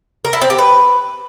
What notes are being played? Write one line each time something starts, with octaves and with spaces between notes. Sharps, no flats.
A#4
E4
C4
G4
B4